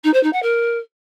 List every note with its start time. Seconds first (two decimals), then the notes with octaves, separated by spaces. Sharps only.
0.04 D#4
0.13 C5
0.23 D#4
0.32 F#5
0.42 A#4